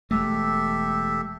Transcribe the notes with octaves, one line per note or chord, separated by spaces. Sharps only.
E1 G#3 A3 G4 A4 E5